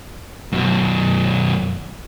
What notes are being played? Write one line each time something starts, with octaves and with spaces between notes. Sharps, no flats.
F#2 B2